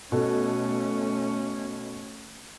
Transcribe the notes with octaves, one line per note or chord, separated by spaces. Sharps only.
B2 A3 C#4 A4